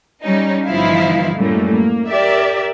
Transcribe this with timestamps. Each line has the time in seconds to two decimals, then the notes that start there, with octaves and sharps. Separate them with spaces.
0.23 G3 C#4 D#4
0.65 G1 E3 F3 D#4 E4 F5
1.35 F#2 A2 G3 A3 A#3
1.71 A#3
2.08 G4 A#4 D5 E5